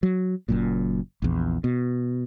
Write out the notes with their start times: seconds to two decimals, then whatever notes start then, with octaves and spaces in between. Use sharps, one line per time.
0.03 F#3
0.49 F#1 F#2 A#2
1.22 A#1 E2
1.64 B2